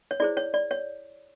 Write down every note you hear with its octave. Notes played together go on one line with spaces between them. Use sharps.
C#5
E4 G#4 C5 D5
C#5
D5
C#5